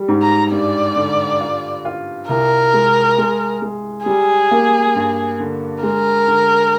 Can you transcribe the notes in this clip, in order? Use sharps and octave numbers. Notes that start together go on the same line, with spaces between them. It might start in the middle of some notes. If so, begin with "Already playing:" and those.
Already playing: G3
G#2
A#5
G2 D5
D3
F4
F4
C2 A#4
G#3
G#3
G#3
G3 G#4
A#3
G2
D3
G#3 A#4
D3